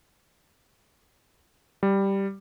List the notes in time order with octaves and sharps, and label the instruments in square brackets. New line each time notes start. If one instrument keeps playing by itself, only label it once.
[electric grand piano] G3